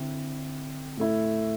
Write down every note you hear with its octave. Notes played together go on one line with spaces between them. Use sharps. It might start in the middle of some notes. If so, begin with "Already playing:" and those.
Already playing: D3 C4 E4
A2 A3 E4